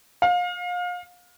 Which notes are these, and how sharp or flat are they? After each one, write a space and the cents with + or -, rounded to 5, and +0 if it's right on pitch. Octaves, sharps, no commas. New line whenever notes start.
F5 +30